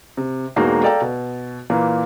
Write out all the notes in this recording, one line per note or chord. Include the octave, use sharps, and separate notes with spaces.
C3
E1 E2 G#3 A#3 D#4 F#4
A4 D5 F5 G5 A#5
B2
A#2 E3 A#3